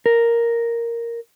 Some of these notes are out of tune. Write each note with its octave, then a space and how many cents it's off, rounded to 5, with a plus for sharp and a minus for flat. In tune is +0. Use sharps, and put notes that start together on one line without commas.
A#4 +0